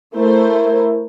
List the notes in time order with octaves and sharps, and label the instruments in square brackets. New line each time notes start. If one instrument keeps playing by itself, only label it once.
[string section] A3 C5 [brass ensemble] E4 A#4